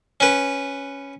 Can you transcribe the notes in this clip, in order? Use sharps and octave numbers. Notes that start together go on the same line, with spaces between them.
C#4 B4